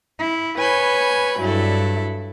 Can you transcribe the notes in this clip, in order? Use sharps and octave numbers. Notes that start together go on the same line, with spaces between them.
E4
B4 C#5 G#5 B5 G6
G2 F#3 E4 A4